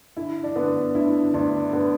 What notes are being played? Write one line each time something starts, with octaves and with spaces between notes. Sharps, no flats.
D3 E4
D4
D3 B3
D2 E4
D2 D4
D3 B3